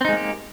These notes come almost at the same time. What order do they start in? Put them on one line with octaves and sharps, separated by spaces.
C4 D#4 G#3 A#3 G4